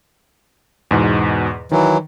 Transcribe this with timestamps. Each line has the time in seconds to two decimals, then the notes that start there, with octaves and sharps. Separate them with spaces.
0.91 E2 G#2 B2
1.71 D#3 E3 F#3